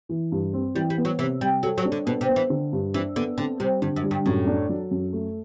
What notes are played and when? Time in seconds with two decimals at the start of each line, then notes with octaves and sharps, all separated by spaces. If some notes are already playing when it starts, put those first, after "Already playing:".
0.09 E3
0.32 G2
0.53 C4
0.75 E3 G3
0.90 G3
0.98 B3
1.05 F#3
1.19 C3 E3
1.41 C3 G3
1.63 F#3 A4
1.78 F#3
1.85 D4
1.92 D3
2.06 B2 B3
2.21 C3
2.29 B3
2.36 E3
2.50 D3
2.73 G2
2.94 E3 D4
3.16 D3 B3
3.38 D3 C4
3.60 C3 G3
3.82 G2 D3
3.96 F#2
4.04 G3
4.11 G2
4.26 F#2 A2
4.47 D4
4.69 F#3
4.91 F#2
5.13 A3